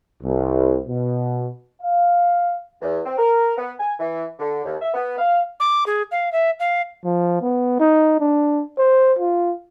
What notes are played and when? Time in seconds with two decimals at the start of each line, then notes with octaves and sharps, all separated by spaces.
0.23 C2
0.89 B2
1.83 F5
2.82 E2
3.06 C4
3.18 A#4
3.58 B3
3.80 G#5
4.00 E3
4.39 D3
4.64 D#2
4.82 E5
4.94 B3
5.18 F5
5.60 D6
5.86 G#4
6.12 F5
6.32 E5
6.60 F5
7.05 F3
7.41 B3
7.80 D#4
8.20 D4
8.78 C5
9.19 F4